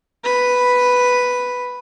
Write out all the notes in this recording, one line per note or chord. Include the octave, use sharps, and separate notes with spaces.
B4 B5